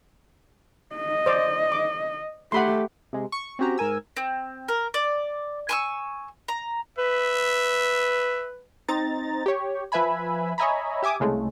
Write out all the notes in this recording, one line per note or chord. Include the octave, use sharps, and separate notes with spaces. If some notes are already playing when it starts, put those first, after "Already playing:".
D#5
C5 D5
D6
A3 G4 F#5 B5 C6
C3 G#3
C#6
C4 C#4 F#4 G4 A#5
G#2 A#4 G#5 E6
C4
A#4
D5
G#5 C#6 E6
A#5
B4 E5
C4 D#4 A#5 A6
G4 C#5
F3 B4 E5 G#5 B5
C#5 D#5 E5 G#5 A#5 B5
G4 E5 G#5 D6 D#6
C2 C#3 G#3 A3